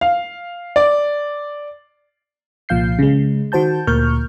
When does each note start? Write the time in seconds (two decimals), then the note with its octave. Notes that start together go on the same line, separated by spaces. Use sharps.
0.01 F5
0.76 D5
2.69 C2 A#2 F3 F5 G6 C7
2.99 C#3 G#3
3.52 D#3 F#4 C5 A5 G6
3.87 D2 A#2 A#4 C#6 F6 G6